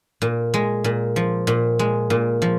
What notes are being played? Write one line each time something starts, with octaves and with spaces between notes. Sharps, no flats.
A#2
G#3
A#2
F3
A#2
G#3
A#2
F3